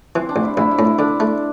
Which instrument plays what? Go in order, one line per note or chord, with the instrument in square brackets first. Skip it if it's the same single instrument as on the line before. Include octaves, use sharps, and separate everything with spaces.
[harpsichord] E3 [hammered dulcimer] C4
[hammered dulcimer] D4
[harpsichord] A1
[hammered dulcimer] E4
[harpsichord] A1 [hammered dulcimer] E4
[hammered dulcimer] E4
[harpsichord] A2
[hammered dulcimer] E4
[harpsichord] D3 [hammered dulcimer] D4
[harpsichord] A3